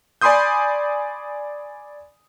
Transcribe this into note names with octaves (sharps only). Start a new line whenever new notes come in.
D5 G#5 B5 C6 D#6 G6